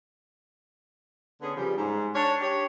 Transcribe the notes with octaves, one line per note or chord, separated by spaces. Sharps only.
D3 B3 C#4 G#4
C#3 F3 G3
G#2
D4 C#5
G4 C#5